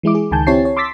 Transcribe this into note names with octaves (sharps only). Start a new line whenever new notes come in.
E3 G#3 E4 D6
G#4
C#2 D#3 G#5 A5 G6
C4 E4 G4 C#5 A5 C7
C#5
C6 D6 E6 A6 B6